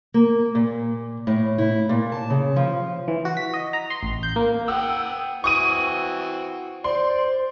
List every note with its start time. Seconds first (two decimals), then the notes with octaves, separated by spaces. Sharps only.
0.14 A#3
0.55 A#2
1.27 A2
1.58 E4
1.89 A#2
2.12 A5
2.30 C#3
2.56 F3
3.08 E3
3.25 F#4
3.37 B6
3.54 D#5
3.73 A#5
3.90 C6
4.03 A1
4.23 G6
4.36 A#3
4.68 F#5 G5 D#6 E6
5.44 E3 C4 F#4 C#6 D#6 D#7
6.84 C5 D5 C6